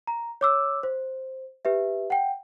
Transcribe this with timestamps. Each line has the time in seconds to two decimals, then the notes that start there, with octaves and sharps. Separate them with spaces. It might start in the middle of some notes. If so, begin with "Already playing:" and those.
0.07 A#5
0.41 C#5 D6 E6
0.83 C5
1.65 G4 B4 E5
2.10 F#5 G5